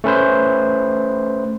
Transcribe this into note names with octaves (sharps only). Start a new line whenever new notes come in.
A3 C#4 B4 C5